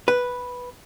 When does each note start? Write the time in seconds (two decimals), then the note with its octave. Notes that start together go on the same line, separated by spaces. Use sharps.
0.08 B4